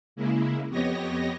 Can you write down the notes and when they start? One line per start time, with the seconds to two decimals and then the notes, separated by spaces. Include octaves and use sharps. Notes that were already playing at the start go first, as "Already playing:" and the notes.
0.16 C#3 G#3 A#3 E4
0.70 F2 B3 G4 C#5 D#5 A#6